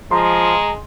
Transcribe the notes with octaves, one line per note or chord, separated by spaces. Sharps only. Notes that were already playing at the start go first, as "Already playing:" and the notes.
F3 G#3 A#5 C6